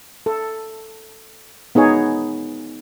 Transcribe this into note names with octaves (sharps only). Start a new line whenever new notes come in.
A4
B3 D#4 G#4 C#5